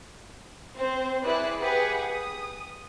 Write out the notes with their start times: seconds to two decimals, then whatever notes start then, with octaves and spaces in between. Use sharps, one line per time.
0.76 C4 C5
1.25 E4 G#4 B4 D5 F#6
1.61 G4 G#4 B4 F#5
2.05 D#6